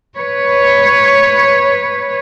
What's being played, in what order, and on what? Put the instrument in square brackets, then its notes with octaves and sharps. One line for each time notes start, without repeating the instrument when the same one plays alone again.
[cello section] B4 C#5